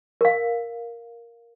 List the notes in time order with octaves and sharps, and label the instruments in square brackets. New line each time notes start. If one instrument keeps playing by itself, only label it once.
[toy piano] A#4 F5